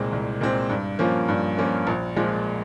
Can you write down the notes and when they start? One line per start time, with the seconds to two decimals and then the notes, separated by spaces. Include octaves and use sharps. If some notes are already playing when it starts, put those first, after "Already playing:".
Already playing: C2 A#2 G#3 C4
0.12 C2
0.41 A#2 G#3 C4
0.69 G2
0.99 F3 A#3 C#4 F4
1.28 G2
1.57 F3 A#3 C#4 F4
1.87 A#1
2.16 A#2 F3 G#3